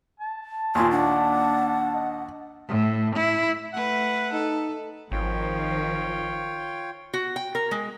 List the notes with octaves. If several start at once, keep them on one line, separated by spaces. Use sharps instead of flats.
A5
D#2 A#2 G#5 C6
D4 F#5
D#5
A2
E4
A3 B4 F#5
D#4 A4
G#1 D#3 F3 F4 C#5 G5
F#4
G5
A#4
G#3